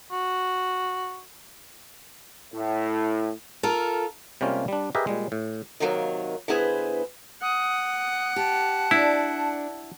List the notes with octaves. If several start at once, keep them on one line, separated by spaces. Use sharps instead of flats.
F#4
A2
F4 A4 A#4
C3 G3 G#3 A#3 C#4 F4
G3 D4
G4 G#4 A#4 B4 D#5 E5
A#2 G3 G#3
A2
D#2 C3 D#3 F#3 A3 A#3
D3 B3 E4 G#4 B4 C5
F#5 D#6
G4 A5
D4 E4